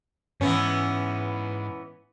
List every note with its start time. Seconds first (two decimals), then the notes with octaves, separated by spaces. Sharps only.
0.41 G#2 E3 B3 C#4